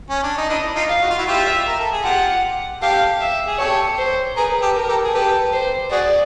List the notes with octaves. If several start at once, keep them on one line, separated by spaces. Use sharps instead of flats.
C#4
D4
D#4
D4 E4 D#5
D#4 F4
F5
F#4
F4
E4 F#4
F4 G4 E5
A#4
A4
G#4
F4 G4 F#5
G4 A4 F5
E5
G#4
G4 A4 C#5
C5
G#4 A#4 B4
G4 A4
A#4
G4 A4
G#4
G4 A4 B4
C5
F#4 G#4 D5